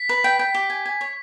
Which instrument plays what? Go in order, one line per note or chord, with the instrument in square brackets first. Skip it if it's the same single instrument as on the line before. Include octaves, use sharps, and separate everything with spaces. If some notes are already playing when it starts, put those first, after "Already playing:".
Already playing: [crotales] B6
[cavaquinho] B4
G5
G5
G4
G#5
G#5
C#5